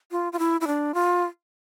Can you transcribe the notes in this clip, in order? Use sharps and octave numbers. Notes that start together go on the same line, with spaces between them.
F4
F4
E4
E4
D4
F4